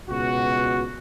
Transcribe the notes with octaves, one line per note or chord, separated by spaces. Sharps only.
C#2 B2 F#4